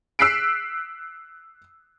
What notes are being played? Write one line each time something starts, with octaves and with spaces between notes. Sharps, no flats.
E6 F#6 B6 C7 D7